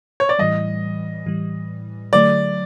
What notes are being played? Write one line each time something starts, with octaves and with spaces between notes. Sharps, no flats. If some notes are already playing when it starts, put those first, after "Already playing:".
C#5
D5
A2 E3 G3 D#5
A2 E3 G3
D3 F#3 A3 D5